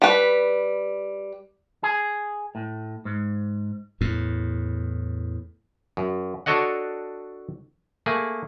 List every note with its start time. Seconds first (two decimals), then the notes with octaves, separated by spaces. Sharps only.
0.02 G3 B4
1.83 G#4
2.55 A2
3.05 G#2
4.01 E2 A2
5.97 F#2
6.46 D4 F#4 A4 C#5 D#5 F#5
8.06 A3 A#3 G#4